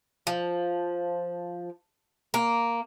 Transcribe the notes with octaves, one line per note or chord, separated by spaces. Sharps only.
F3
A#3